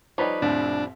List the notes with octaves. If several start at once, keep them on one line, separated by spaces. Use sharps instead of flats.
F3 G3 D#4 B4 C#5
C2 F2 A2 D4